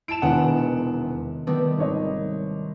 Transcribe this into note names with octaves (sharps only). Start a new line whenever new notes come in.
E4 E5 A5 D7 E7
E1 E2 C3 D#3 B3 F#5
D#3 G3 A3 B3
G#1 C#5 D#5